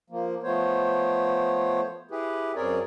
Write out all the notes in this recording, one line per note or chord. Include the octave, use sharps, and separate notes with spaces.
F3 A#3
F3 A3 B3 C5 C#5
E4 G4 G#4 B4
F#2 C4 G#4 A#4 C#5 D5